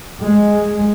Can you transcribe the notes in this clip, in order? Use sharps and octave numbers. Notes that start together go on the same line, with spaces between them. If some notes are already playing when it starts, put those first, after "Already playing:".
G#3